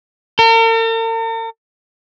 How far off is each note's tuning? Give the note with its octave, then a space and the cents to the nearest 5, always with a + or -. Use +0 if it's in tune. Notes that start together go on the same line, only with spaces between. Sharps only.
A#4 -45